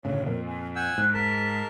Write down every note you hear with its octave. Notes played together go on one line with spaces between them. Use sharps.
G1 A2 C#3 C#5
F2 A#2 A#4
G#5
F#5 G#5 E6 G6
G#2 F#6
F1 A#4 A5 B6